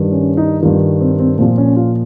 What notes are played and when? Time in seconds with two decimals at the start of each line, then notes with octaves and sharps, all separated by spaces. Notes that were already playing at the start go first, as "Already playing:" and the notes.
Already playing: G2 D#3
0.12 C#4
0.37 D#4
0.62 G2 D#3 F4
1.01 C4
1.19 C4
1.39 A#2 F3 C4
1.58 C#4
1.76 F4